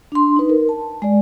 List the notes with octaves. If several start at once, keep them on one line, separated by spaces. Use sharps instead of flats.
D4 C6
D#4 B4
A#4
A5
G#3 D5